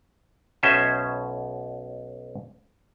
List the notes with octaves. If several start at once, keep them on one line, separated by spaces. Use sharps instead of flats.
B1 B2 C#4 C5 D#5 E5